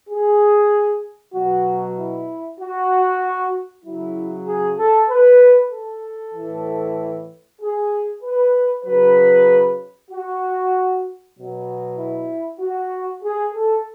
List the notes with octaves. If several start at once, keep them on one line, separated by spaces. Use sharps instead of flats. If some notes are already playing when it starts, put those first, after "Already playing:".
G#4
B2 F#3 F#4
E4
F#4
C#3 F#3 E4
G#4
A4
B4
A4
A2 E3
G#4
B4
C#3 F#3 B4
F#4
B2 F#3
E4
F#4
G#4
A4